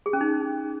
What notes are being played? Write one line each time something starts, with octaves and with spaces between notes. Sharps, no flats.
G#4
C#4
D#4